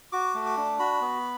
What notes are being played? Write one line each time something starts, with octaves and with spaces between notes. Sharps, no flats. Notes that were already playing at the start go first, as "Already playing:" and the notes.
F#4 D6
A3
D6
D4
F#4 B5
B3